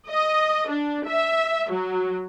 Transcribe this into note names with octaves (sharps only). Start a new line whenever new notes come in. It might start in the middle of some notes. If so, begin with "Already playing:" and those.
D#5
D4
E5
F#3